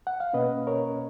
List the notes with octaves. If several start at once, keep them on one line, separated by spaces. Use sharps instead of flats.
F#5
F5
B2 A#3 C#4 B4 D#5
A#4 C#5